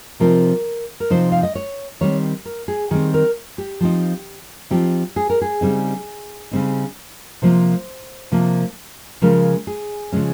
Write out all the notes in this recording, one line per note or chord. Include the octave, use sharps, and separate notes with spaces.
C3 F3 C4 D#4 A#4
A#4
C3 F3 C4 D#4 C5
F5
D#5
C#5
D#3 G3 C4 C#5
A#4
G#4
D#3 G3 C4 G#4
A#4
G4
F3 C4 D#4
F3 C4 D#4 G4
G#4
A#4
G#4
C#3 G3 C4 D#4
C#3 G3 C4 D#4
C3 F3 A#3 C5
C3 F3 A#3
C#3 F3 G#3 C#4 A#4
G#4
C#3 F3 G#3 C#4